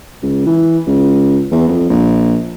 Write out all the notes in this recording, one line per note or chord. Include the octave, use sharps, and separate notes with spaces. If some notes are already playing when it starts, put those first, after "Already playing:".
C#2
E3
C#2
E2
F2
A#1